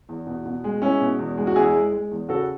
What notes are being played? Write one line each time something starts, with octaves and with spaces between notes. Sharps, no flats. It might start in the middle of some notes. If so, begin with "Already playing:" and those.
E2
B2
B2
G#3
G#3 C#4 E4
B2
E2
G#3
F#4
E2 E4 G#4
G#3
G#3
E2
C#3 F#4 A4